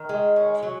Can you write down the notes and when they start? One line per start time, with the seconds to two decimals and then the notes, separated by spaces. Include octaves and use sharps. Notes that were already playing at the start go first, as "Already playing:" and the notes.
Already playing: D#3
0.09 G#3
0.36 C#4
0.63 F#3